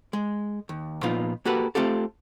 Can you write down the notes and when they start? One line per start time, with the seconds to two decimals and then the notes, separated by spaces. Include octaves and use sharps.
0.13 G#3
0.69 D#2
1.03 A#2 F3 B3 D#4 F4
1.45 A#3 F#4 G4 A4 B4
1.75 A3 C4 F4 G4 A4